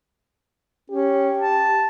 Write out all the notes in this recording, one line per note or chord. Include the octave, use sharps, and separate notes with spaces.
C#4 G4
A5